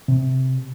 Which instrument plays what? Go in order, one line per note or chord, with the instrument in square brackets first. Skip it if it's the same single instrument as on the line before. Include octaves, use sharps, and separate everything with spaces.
[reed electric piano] C3